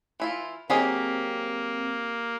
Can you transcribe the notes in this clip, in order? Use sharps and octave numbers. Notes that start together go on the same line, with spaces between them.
E3 E4 F4
F#3 A#3 C4 G4 G#4 D#5